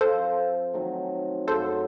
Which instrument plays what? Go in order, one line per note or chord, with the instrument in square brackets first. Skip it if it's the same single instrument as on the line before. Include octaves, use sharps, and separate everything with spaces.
[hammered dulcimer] F3 C4 F4 [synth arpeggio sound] A4 C5
[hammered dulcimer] D#3 F#3 A3 C4
[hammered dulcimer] F#2 C#3 F#3 [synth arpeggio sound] A4 C5